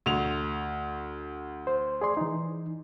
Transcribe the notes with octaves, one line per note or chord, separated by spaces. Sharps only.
D2 F7
C5
G#4 D5 C6
E3 D#4